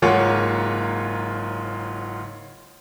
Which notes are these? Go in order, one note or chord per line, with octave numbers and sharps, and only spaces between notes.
F#1 G#2 A#3 F4 C#5 F#5